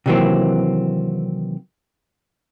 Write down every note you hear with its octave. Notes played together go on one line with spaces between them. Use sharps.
C3 D#3 E3 F#3 A#3 C4